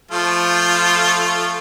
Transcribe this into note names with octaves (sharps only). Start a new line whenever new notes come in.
F3 A3 F4